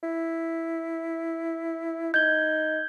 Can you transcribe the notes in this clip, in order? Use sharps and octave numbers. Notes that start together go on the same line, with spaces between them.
E4
D#4 G6 G#6 G7